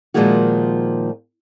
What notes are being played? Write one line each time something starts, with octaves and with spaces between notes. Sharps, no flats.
A#2 D#3 F3 G#3 A#3 F#4